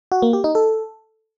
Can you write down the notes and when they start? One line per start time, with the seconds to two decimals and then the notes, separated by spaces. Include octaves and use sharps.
0.12 F#4
0.22 A#3
0.33 G4
0.44 D#4
0.55 A4